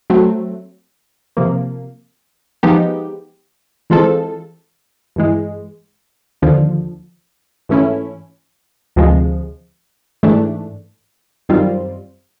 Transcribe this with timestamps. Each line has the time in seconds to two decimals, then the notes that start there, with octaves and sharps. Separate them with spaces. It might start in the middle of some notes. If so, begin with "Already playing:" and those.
0.10 F#3 A3 C4
1.37 C3 F3 A#3
2.63 F3 G#3 B3 D#4 G4
3.90 E3 G#3 C4 F4 A4
5.16 G2 E3 G#3
6.42 D#2 D3 F3
7.69 G#2 E3 A3 C#4 E4
8.96 D2 C3 F3 G#3
10.23 G#2 E3 A3 D4
11.49 F#2 D#3 G3 C4 F4